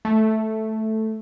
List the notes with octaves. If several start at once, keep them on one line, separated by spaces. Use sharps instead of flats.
A3